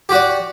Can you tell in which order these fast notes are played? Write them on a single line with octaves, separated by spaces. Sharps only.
G4 F#4 D5